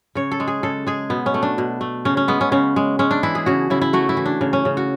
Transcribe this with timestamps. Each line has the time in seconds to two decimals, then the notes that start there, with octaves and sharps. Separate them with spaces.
0.15 C#3 C#5
0.31 A4
0.40 G#3
0.48 G#4
0.63 C#3 A4
0.87 G#3 G#4
1.10 B2 B3
1.26 C#4
1.34 A3
1.43 D4
1.58 B2
1.81 A3
2.05 C#3 C#4
2.17 C#4
2.28 G#3 B3
2.41 C#4
2.52 C#3 C#4
2.76 G#3
2.99 G#3 C#4
3.11 D4
3.23 E3 E4
3.35 G#4
3.46 C#3 F#4
3.70 C#3 E4
3.82 E4
3.93 A3 F#4
4.09 E4
4.17 E3
4.26 D4
4.41 C#3
4.53 C#4
4.65 C#3
4.77 F#4